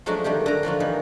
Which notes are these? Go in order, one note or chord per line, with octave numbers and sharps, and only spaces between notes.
F3 F#3 G#3 A3 D4 F#4
D3 D#3 G3 G4
D3 A#5
F3 F#3 F4 F#4
D#3 E3 D#4